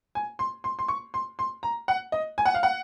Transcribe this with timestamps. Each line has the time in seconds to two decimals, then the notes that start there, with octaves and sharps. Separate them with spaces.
0.15 G#5
0.39 C6
0.64 C6
0.79 C6
0.88 C#6
1.14 C6
1.39 C6
1.63 A#5
1.88 F#5
2.12 D#5
2.38 G#5
2.46 F#5
2.54 F5
2.63 F#5